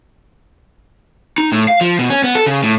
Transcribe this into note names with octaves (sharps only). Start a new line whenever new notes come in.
D#4
A2
F5
F3
B2
C#4
B3
A4
C#3
A2